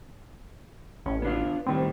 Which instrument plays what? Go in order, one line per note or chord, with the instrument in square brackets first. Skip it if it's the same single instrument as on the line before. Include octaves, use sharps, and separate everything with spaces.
[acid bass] A1 [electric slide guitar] C#4
[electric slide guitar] B3 D4 F4
[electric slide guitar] A2 D#3 G3 [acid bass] C4